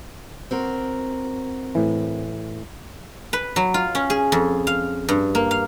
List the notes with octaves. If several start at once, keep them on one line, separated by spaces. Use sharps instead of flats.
C4 F#4 A#4
A2 E3
B4
F#3
F4
C#4
G#4
F2
F5
G2
A#3
F5